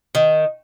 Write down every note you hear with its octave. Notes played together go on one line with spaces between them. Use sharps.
D#3